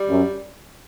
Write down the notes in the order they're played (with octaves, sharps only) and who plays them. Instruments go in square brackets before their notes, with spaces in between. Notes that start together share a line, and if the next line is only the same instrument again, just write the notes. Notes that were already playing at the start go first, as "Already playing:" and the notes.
Already playing: [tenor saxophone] G3
[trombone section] F#2